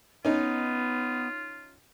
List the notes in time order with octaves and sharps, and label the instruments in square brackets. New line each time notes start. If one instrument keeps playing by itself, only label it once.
[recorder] B3 [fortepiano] C#4 D#4 [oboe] F4